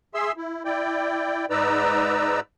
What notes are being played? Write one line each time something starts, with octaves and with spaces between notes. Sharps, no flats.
G#4 E5 C6 E6
E4
E4 D5 G5
G#2 D#4 B4 D5 A#5 E6